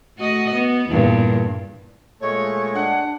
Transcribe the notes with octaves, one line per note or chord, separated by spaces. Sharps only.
A3 F#4 D#5
B3
E2 G2 A#2
A#2 G#3 A3 C#5
D4 F#5